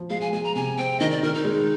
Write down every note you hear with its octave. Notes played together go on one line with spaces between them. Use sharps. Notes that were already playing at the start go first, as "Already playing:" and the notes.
Already playing: F3
G#3 F5
G#5
G#3 G#5
A#5
C3 G#5
C4 G5
D#3 D#5
D5
D#3 A#4
D#4
G#3